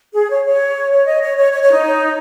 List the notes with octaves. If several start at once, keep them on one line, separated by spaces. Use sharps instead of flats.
G#4
C#5
C#5
C#5
D#5
C#5
C#5
C#5
C#5
D#4